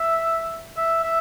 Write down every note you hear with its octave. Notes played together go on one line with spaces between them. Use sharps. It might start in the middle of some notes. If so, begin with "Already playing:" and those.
Already playing: E5
E5
E5